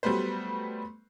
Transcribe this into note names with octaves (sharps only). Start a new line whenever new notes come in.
F#3 G3 A3 B3 B4 C5